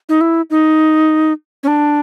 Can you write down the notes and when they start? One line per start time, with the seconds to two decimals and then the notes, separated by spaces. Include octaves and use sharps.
0.09 D#4
0.21 E4
0.50 D#4
1.63 C#4
1.67 D4